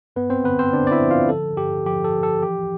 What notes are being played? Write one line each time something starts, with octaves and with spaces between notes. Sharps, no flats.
G2 B3 B4
C4 C5
D3 B3 B4
C4 C5
D3 D4 D5
D5
E4 E5
F3
F4 F5
F3 A4
G2 G4
F3 G4
A4
F3
A4
E3 G4